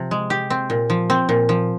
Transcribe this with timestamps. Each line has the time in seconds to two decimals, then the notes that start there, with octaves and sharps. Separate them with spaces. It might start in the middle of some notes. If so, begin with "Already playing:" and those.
Already playing: C3 F3
0.11 G#3
0.30 G4
0.50 C4
0.70 A#2
0.90 F3
1.10 C4
1.29 A#2
1.49 F3